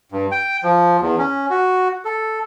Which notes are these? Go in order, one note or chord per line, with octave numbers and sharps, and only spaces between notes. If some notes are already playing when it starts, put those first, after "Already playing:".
G2
G5
F3
E2
C#4
F#4
A4